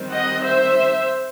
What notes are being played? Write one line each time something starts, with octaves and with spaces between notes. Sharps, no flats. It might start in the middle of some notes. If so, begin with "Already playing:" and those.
Already playing: D#3 G3 C4
D#5 F#5
C5 E5